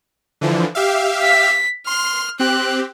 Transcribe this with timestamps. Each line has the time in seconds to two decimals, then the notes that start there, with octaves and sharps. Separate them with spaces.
0.41 D3 E3 F3
0.75 G4 E5 F5
1.22 B6
1.87 C6 F6
2.39 C4 G4 F#6